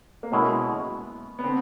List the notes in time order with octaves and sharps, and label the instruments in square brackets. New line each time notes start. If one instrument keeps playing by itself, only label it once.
[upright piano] A#3
[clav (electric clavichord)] B2 G#3 C#4 E4 [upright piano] B3
[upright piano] B3
[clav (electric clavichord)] D3 [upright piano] C4